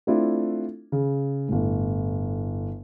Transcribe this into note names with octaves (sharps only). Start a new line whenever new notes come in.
A3 C4 D4 E4 F4
C#3
G1 A2